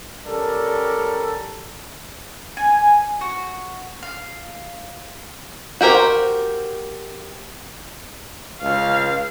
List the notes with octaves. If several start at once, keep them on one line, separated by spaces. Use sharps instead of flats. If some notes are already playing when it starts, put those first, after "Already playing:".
G3 C#4 A4 A#4 D5
G#5
F#4
F5
F#4 G4 A#4 C5
C#2 F5